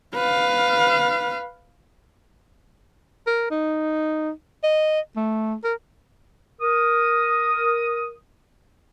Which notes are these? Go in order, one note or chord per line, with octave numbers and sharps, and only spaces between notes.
B4 F5
A#4
D#4
D#5
A3
A#4
A#4 D#6